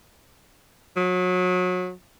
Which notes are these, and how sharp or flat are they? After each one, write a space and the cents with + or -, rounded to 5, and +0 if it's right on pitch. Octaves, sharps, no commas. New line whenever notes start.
F#3 -30